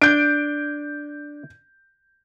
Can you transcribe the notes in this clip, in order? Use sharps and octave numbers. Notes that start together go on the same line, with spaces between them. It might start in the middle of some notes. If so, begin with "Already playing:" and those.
D4 G6 D7